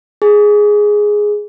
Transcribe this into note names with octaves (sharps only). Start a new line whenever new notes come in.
G#4